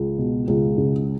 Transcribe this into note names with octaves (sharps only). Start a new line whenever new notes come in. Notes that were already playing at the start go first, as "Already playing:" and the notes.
Already playing: C#2
B2
C#2
C#3